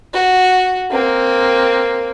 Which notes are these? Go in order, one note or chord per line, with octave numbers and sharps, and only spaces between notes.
F#4
A#3 C4